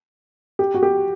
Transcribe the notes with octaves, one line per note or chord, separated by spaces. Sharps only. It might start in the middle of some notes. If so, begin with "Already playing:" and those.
G4
F#4
G4